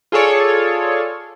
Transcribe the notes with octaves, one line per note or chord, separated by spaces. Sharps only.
F4 G#4 A4 C#5 D5